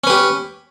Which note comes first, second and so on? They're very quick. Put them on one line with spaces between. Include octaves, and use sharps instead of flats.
C#4 B4 G4